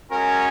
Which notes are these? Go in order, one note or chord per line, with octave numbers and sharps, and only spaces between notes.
G#3 C#4 F#4 A#4